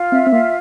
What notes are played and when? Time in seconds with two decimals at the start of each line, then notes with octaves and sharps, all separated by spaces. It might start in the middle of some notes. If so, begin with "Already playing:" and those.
Already playing: F4
0.12 C4 E5
0.26 C4
0.32 A#3 F4